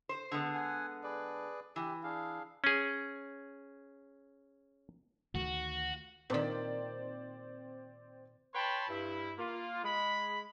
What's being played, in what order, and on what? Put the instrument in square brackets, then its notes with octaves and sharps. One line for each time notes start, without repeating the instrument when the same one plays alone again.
[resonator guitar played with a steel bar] C5
D3 G#3 B3
[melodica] F#5 G#5
G#4 B4 D5
[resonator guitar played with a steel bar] E3 [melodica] G4
[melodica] D4 G#4 F5
[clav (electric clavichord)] C#4 G#4
[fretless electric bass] D2 D#3 A3 [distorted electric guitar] F#4
[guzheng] A#2 D#3 [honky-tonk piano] C4 D5
[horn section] B4 C#5 G5 A5 B5 C6
G2 E4
A#3 F4
G#3 B5